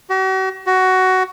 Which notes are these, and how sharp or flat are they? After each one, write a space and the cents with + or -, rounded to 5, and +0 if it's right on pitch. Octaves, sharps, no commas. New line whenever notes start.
F#4 +45
F#4 +15